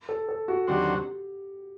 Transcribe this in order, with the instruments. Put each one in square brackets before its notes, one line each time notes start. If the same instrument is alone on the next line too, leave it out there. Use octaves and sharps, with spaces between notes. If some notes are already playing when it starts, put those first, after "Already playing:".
[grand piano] A4
A4
F#4
[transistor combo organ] D#2 D3 F#3 C4 F#4 [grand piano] G4